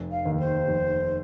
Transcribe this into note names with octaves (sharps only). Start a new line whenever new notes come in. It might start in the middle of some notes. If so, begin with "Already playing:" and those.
Already playing: F1
F5
D#2 D#3
C5
F1